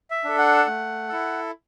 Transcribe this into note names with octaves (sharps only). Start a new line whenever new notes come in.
E5
D4 A4
F#5
A3
E4 A4